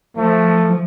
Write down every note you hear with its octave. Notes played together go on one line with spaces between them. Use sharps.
F3 A3